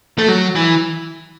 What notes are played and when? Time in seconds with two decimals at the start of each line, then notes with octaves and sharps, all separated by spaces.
0.18 A3
0.28 F#3
0.55 E3